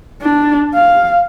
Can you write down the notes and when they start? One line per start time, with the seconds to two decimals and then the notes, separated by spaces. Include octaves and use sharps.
0.23 D4
0.75 F5